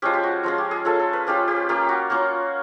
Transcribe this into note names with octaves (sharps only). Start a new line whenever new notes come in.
F3 G#3 C#4 G4
G4
F#4
F3 G#3 C#4 F4
G4
G#4
F3 G#3 C#4 F4 A4
A4
B4
F3 G#3 C#4 F4 G4
G4
A#3 C#4 F4 G4
F#4
A#3 C#4 F4 F#4